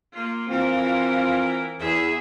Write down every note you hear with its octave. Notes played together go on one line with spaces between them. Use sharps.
A#3 F4
E3 C4 F4 A#4
E2 G#4 E5